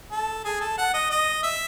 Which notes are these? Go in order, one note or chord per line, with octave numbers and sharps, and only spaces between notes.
A4
G#4
A4
F#5
D#5
D#5
E5